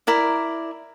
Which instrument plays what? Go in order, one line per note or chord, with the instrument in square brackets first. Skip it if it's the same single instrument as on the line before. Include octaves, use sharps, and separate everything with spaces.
[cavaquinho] E4 A#4 D5